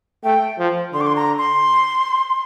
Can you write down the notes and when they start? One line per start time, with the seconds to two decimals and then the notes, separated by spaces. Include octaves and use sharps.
0.24 A3 G5
0.59 F3
0.93 D3 C6
1.01 D6
1.07 C6
1.16 A#5
1.38 C6